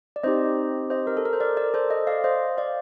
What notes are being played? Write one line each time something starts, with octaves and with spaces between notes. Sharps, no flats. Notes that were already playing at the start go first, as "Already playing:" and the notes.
D5
C4 D#4 G4 C5 D#5
C5 D#5
A#4
A4
A#4
C5
A#4 D5
A#4 D5
A4 C5
C5 D#5
D5 F5
C5 D#5
D5 F5